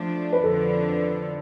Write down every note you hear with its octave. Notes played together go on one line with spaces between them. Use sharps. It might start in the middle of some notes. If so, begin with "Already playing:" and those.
Already playing: F3 A3 D4
B4
F2 D3 F3 A4